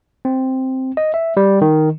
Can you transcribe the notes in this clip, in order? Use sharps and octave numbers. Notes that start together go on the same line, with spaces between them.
C4
D#5
E5
G3
D#3